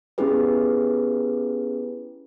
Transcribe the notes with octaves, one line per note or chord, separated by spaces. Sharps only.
B3 C#4 E4 G4 G#4 B4